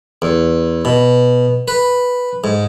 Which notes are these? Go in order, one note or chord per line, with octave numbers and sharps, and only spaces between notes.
E2
B2
B4
G#2